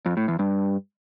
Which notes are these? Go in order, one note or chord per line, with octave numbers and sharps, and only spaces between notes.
F2
A2
E2
G2